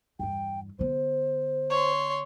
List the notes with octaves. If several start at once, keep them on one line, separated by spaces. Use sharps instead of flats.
E2 G2 G5
D3 B3 C5
C#5 C6